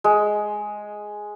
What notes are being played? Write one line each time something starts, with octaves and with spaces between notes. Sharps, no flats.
G#3